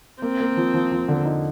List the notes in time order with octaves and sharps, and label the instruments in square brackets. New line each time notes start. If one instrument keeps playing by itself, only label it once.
[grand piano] A#3 [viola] C4
[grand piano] A#3
F3
F3
F3
D3
D#4